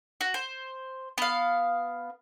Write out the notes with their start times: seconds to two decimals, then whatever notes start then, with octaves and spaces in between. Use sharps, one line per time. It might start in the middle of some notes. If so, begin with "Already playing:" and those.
0.21 F#4
0.34 C5
1.18 B3 F5